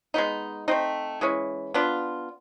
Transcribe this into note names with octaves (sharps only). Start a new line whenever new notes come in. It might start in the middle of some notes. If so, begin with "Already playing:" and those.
G#3 B3 D#4
A3 C4 D#4
E3 G#3 C#4
B3 D4 F4